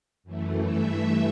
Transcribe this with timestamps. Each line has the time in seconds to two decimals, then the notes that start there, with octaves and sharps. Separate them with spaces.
0.24 F#2 E3 A3
0.65 G2 E3 A3 E5